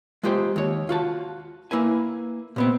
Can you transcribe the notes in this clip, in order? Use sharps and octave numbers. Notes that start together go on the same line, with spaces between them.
G#3 F4 G4 C5
D#2 C#5
F4 F#4 A5
A#3 E4 B4 G#5
A#2 B3 C4